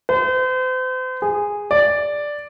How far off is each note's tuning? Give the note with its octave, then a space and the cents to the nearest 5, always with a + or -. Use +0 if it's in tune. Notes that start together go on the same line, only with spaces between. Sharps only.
C5 -40
G#4 -10
D5 +0